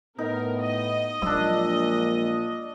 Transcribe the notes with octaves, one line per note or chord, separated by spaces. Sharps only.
A2 B3 D#4 A#4
D#5
A#1 A#2 F#3 G#3 D4 E6